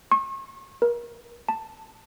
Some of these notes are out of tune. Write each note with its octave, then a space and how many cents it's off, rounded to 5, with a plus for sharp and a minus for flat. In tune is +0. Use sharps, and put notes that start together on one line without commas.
C#6 -40
A#4 +35
A5 +10